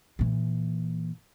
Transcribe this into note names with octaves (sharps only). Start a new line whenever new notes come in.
A#2 E3